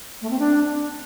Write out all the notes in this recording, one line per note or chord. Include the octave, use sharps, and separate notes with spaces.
A3
C4
D4